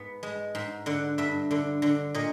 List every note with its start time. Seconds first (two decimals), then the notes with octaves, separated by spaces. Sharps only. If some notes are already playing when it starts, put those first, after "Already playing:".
Already playing: G#2 B3
0.23 G#3
0.55 G#2
0.86 D3 F#5
1.18 G2 E5
1.51 D3
1.82 D3
2.14 A#2 D#5